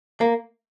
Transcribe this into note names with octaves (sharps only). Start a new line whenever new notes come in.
A#3